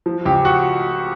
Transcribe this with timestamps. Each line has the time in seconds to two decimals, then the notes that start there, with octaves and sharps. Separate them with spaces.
0.06 F3
0.26 C#2 G4
0.45 F#4